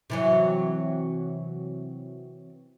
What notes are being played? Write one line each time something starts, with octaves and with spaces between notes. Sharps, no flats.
C3 E3 F#3